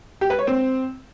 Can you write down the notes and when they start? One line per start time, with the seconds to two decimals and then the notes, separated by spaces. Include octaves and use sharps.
0.21 G4
0.30 B4
0.39 C#5
0.47 C4